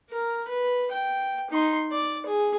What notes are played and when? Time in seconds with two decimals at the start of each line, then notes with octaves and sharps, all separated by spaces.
0.10 A#4
0.48 B4
0.91 G5
1.50 D#4 C6
1.91 D5
2.26 G#4